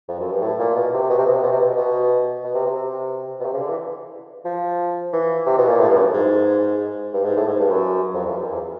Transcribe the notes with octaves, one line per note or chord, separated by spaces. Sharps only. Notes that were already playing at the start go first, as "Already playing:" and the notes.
F2
F#2
G2
A2
A#2
B2
C3
B2
C3
B2
C3
B2
C3
B2
B2
B2
C3
C3
B2
C3
C#3
D3
E3
F3
E3
C3
B2
A#2
A2
G2
F#2
G#2
G2
G#2
A2
G#2
G2
F#2
F2
E2
F#2
F2
E2